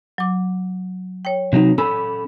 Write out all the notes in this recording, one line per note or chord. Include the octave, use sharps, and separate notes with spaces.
F#3 D6
C#5 G5
C3 F#3 D#4
C#4 A4 B5 E6